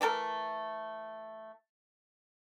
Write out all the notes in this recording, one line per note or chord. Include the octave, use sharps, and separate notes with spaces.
E3 A3 A4 A#4